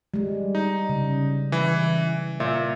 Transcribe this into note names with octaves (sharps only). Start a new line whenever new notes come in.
G3 G#3
D#4
C#3
E3
A#2 E5